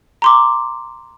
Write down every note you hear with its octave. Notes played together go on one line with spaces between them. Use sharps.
A#5 C6 D6